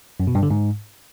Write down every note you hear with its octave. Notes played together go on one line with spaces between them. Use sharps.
F#2
B2
G2
D3
G#2